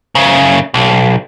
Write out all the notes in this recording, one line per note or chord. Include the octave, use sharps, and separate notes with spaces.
F#2 C#3
B1